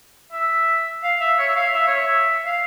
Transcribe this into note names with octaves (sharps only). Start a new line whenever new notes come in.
E5
F5
E5
C#5
E5
F5
E5
C#5
E5
F5